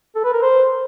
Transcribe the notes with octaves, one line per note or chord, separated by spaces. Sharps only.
A4
B4
A#4
C5